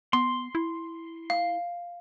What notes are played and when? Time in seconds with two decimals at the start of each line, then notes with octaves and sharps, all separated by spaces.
0.13 B3 C6
0.55 E4
1.30 F5